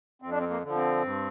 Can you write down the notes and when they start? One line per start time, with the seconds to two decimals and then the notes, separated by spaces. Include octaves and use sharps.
0.22 F2 C4
0.30 D4
0.40 C4
0.50 A#3
0.63 D3 F3
0.76 C4
1.03 G2